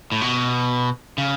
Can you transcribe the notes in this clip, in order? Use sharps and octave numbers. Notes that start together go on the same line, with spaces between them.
A2
B2
C#3